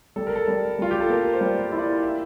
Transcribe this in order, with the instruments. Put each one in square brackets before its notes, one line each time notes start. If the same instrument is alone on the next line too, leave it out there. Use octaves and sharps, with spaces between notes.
[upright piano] G3 [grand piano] A4
[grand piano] A#4
A4
[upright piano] G3
[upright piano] G3 [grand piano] F4
[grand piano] G4
A4
[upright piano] A#3 [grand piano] A#4
[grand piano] C5
[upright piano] G3
E4
[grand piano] D5
E5